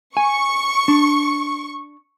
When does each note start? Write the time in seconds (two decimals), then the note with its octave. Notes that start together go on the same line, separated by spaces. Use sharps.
0.17 G#5 C#6
0.88 D4